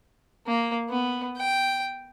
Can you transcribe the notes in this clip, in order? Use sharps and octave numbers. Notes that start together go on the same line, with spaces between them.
A#3
B3
G5